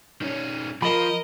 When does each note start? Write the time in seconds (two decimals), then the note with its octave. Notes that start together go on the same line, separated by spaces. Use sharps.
0.22 D#3 C#4
0.82 F3 A#4 D#5 B5